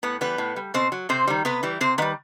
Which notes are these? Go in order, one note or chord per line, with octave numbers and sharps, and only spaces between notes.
A2 B3 B4
E3 G3 B3 B4
A2
G3
B2 C4 C5
F#3
C3 C4 C5
D#3 G3
C3 B3 B4
E3 G3
C3 C4 C5
D#3 G3 B3 B4